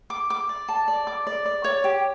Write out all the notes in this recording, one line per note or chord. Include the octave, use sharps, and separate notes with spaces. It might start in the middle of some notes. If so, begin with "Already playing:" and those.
D6
D6
D5
A5
D5
D6
D5
D5
C#5
G4